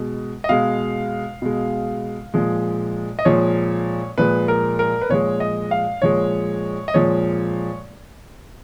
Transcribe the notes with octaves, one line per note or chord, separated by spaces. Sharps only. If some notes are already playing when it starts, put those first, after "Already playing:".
Already playing: B2 G#3
D#5
B2 G#3 F5
B2 G#3
A#2 F3 G#3
D#5
A#2 F3 G#3 C#5
A#2 F3 G#3 B4
A#4
A#4
B4
A#2 F3 G#3 C#5
D#5
F5
A#2 F3 G#3 C#5
D#5
A#2 F3 G#3 C#5